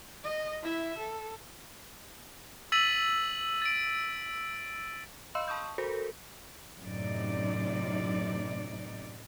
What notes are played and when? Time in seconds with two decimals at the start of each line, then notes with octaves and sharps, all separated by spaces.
0.23 D#5
0.62 E4 E5
0.98 A4
2.72 E6 A6 B6 D#7 F#7
3.62 A6 D7
5.35 D#5 F5 B5 C6 E6
5.48 A5 C#6 D#6 G6
5.78 F#4 A4 A#4 C5
6.81 F#2 A2 C3 D#4 D5